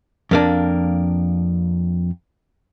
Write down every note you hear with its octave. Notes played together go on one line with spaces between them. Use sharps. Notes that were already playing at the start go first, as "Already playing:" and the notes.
F2 A#3 D4